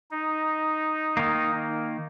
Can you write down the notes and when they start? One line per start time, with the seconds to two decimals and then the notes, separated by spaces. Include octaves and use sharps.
0.11 D#4
1.17 D#3 A#3